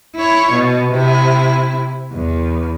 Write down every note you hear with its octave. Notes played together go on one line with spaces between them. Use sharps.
E4 C#5
B2
C3 E4
E2